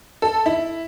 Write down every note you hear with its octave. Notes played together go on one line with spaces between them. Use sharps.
A4
E4